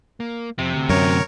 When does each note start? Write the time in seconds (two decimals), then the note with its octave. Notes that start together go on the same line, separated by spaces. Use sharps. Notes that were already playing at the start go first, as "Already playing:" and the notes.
0.20 A#3
0.58 F2 C3
0.75 D2
0.89 F#2 A#4 C#5